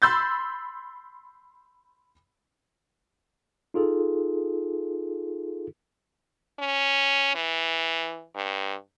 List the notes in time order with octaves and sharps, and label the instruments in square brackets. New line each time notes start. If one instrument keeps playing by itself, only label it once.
[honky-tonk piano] B5 C6 E6 G6 A6
[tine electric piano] D#4 F4 G#4 A4
[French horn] C#4
E3
G2